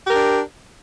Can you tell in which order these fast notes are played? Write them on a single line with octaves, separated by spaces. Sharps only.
G4 A#4 D4